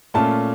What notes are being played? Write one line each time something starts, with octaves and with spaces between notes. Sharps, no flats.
A#2 A3 C#4 F4 A5